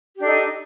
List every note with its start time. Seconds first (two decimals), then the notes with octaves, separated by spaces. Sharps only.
0.17 G4
0.19 D4
0.22 A4
0.25 D#4